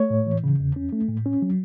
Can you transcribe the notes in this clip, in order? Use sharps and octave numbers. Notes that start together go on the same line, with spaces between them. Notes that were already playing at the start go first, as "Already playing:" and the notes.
Already playing: A3 C#5
A2
E3
C#3
E2
C#4
A3
A2
C#4
F#3